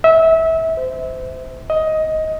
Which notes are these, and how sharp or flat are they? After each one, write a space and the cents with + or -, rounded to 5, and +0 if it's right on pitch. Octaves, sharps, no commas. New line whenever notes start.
E5 -25
C5 -25
D#5 +15